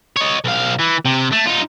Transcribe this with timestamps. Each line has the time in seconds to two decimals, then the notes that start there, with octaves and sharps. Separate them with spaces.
0.17 C#5 D#5
0.44 B1 F5
0.79 E3
1.05 C3
1.33 A3
1.47 D#4 F4